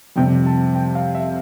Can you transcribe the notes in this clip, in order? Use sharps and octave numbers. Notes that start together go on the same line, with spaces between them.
F2 C3 G3 G5
A5
G5
F5
E5